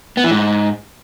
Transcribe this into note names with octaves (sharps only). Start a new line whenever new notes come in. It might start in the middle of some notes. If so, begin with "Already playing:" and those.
B3
E3
G#2